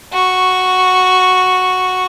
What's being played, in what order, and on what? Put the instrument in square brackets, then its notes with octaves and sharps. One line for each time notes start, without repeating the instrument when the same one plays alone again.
[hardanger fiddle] F#4 C#6